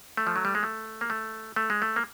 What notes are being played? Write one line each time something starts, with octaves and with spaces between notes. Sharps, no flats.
A3
F3
F#3
G3
G#3
A3
A#3
A3
A3
G#3
A3
A#3